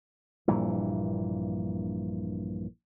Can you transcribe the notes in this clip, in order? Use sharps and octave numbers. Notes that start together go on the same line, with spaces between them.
A#1 G2 A#2 E3